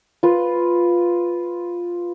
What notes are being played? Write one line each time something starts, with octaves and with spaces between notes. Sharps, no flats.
F4 B4